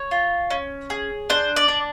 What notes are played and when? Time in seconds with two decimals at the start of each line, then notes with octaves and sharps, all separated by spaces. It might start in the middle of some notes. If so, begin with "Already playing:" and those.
Already playing: C#5
0.11 F4
0.51 C#4
0.90 G#4
1.30 D4 C5
1.56 D5
1.68 D4